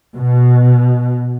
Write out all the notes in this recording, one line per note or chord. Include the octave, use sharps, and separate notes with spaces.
B2